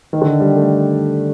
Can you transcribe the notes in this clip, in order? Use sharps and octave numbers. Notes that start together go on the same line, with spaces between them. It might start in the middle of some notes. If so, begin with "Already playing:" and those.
D#3
D3
D#3
G3
A3